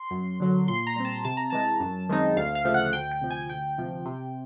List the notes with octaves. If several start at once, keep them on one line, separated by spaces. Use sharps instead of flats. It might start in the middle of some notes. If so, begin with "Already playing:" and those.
Already playing: C6
F#2
D3 F#3
A#2 C6
A#5
G3 C4
A5
C3 A5
A#5
E3 G#3 A5
F#2
D#3 G#3 C4 D#4
D2 F5
F5
C#3 F3 A3
F#5
D2 G5
G5
C3 F3
G#5
D2 G5
C3 F3
C3